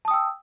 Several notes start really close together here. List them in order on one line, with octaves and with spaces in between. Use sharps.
A5 D#6 G5 E6